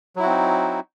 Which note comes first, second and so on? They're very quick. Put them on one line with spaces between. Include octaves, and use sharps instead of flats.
F#3 E4 F#4 C4 D#4